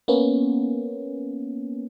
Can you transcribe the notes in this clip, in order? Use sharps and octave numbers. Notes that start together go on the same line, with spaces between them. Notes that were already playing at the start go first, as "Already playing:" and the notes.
A#3 B3 C#4